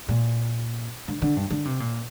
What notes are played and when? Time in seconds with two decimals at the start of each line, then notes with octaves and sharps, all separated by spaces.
0.09 A#2
1.08 D3
1.22 D3
1.36 G2
1.51 D3
1.65 C3
1.80 A#2